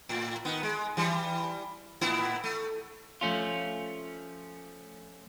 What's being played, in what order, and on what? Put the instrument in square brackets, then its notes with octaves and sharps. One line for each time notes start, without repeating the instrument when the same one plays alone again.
[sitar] A2
D#3 B3
G#3
E3 G3
A2 B3 E4
A3
[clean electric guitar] F3 A3 C#4 F4